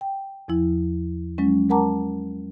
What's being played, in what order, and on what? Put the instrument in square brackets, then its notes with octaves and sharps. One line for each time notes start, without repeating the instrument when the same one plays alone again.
[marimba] G5
E2 F3 E4
F#3 G#3 C#4
G#3 A#4 F#5 A5 A#5 D6